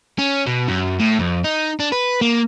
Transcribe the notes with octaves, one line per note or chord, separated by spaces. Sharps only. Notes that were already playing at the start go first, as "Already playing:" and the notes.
C#4
B2
F#2
A2
F2
D#4
D4
B4
A#3